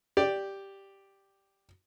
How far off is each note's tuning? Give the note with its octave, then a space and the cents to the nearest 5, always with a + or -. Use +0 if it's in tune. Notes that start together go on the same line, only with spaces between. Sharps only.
G4 +0 D5 +0